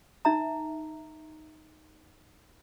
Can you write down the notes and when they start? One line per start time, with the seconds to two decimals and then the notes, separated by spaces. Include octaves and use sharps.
0.25 D#4 E5 A#5